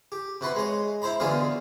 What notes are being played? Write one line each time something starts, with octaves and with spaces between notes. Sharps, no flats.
G4
C3 F#4 B4 C6
G#3 C#5
E4 C5 A#5 B5
A1 B2 D3 F4 G#4 F5